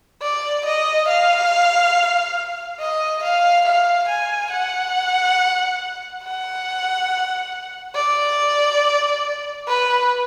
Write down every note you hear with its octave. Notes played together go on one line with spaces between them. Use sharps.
D5
D#5
F5
D#5
F5
F5
G#5
F#5
F#5
D5
B4